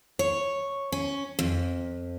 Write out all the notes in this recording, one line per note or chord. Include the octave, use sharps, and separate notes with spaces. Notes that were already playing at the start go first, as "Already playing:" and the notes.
C#5
C#4
F2